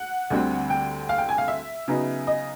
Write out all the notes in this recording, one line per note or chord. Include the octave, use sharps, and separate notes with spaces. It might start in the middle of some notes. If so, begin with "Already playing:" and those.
Already playing: F#5
D2 D3 G3 C4
G5
F5
G5
G#5
F5
E5
C#3 F#3 B3 D#4
D#5